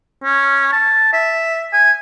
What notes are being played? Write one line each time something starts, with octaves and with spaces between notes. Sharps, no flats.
C#4
A5
E5
G#5